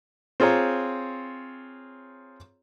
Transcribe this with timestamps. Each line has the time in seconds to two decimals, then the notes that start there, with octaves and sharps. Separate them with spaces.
0.40 C4 F4 G#4 C#5 A#5